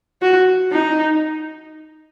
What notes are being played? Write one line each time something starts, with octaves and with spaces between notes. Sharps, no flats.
F#4
D#4